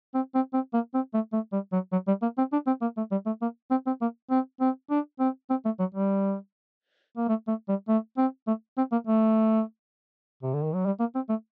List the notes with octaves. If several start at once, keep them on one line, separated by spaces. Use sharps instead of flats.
C4
C4
C4
A#3
C4
A3
A3
G3
F#3
F#3
G3
A#3
C4
D4
C4
A#3
A3
G3
A3
A#3
C4
C4
A#3
C4
C4
D4
C4
C4
A3
F#3
G3
A#3
A3
A3
G3
A3
C4
A3
C4
A#3
A3
C3
D3
D#3
F#3
G3
A#3
C4
A3